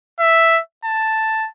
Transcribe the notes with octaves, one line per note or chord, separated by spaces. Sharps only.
E5
A5